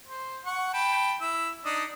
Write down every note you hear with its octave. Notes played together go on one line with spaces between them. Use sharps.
C5
F#5 C#6
G5 A5 B5
E4 E6
D4 D#4 D#5